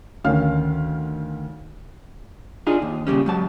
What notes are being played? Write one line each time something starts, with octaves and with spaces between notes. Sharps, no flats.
D2 D#3 C#4 F5 F6
D4 D#4 F4 G#4
D#2
A#2 C#3 G3 C#4
G#2 F#3 A5